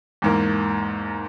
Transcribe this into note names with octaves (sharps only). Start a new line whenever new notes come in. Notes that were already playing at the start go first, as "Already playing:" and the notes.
E2 G#2 A#3